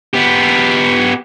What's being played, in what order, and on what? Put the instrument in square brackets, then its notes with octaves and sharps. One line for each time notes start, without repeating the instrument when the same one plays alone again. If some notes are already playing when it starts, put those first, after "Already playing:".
[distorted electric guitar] B3 G4